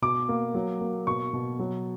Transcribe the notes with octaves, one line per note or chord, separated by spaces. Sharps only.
B2 D6
A#3
F#3
A#3
B2 C#6
B2
F#3